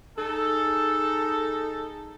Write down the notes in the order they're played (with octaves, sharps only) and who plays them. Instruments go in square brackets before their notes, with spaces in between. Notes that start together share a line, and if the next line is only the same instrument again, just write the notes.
[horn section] D#4 G#4 A4